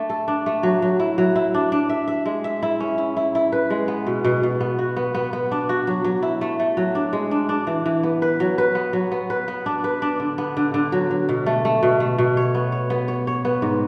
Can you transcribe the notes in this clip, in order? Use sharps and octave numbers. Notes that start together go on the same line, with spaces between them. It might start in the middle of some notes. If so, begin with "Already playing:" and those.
Already playing: A3 D4
A4
D4
A3
F#3
F#3
E4
F#3
E4
D4
D4
E5
E5
G#3
E5
E4
C#4
E4
E4
E4
B4
G#3
B3
B2
B2
B2
B3
F#4
B3
B3
B3
D4
F#4
F#3
F#3
E4
A3
A3
F#3
D4
G#3
D4
D4
E3
E3
B3
B4
F#3
B4
B3
F#3
B3
B4
B3
D4
B4
D4
D3
B3
D3
D3
F#3
F#3
B2
A3
A3
B2
A3
B2
C#5
B3
C#5
B3
C#5
C#5
B3
G#2